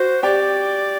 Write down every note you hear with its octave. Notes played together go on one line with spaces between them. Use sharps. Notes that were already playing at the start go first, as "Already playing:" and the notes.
Already playing: F#4 C5
G4 D5 G5